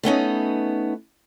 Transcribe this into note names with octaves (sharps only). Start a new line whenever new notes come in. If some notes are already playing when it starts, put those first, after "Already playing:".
A3 B3 C#4 D#4